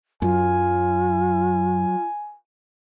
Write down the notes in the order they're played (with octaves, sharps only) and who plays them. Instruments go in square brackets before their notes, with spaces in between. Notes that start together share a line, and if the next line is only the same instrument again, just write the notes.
[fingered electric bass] F#2 [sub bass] F#3 [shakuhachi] F4 [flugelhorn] G#5